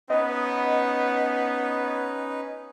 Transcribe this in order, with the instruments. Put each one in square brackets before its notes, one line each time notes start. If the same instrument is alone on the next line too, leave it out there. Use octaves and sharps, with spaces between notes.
[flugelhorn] B3 [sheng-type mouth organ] C#4 D#4 B4 [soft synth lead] D#5